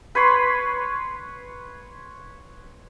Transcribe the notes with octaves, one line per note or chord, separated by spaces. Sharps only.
B4 C#5 C6